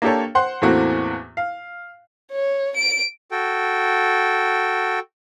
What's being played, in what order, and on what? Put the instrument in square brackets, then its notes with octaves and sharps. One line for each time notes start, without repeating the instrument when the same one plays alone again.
[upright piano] A#3 D4 G4 A4 C#5
C5 F#5 C6
E2 A2 A3 A#3 C4 F#4
F5
[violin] C#5
D7
[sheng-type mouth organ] F#4 A4 G5